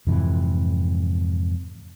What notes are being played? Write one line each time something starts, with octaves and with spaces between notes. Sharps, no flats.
F2 G#2 C3 E3